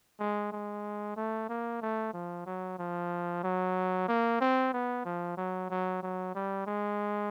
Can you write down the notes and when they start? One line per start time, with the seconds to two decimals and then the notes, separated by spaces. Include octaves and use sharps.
0.19 G#3
0.52 G#3
1.16 A3
1.49 A#3
1.82 A3
2.13 F3
2.46 F#3
2.79 F3
3.43 F#3
4.08 A#3
4.41 C4
4.73 B3
5.05 F3
5.37 F#3
5.70 F#3
6.03 F#3
6.35 G3
6.66 G#3